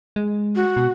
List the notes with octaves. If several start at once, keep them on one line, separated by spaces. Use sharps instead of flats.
G#3
F#4
B2